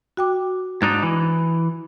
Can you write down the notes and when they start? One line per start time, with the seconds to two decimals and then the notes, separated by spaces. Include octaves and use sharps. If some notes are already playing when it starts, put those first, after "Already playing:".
0.17 F#4 G5 D6
0.82 G#2 D4 D#4 A6
1.03 E3